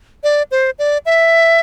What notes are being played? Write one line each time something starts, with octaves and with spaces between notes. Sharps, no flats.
D5
C5
D5
E5